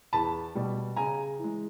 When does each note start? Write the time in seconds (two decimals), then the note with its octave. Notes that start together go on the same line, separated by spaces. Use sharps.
0.13 E2 A5 B5
0.55 B2 G3
0.96 C#3 G#5 A#5
1.39 E3 G#3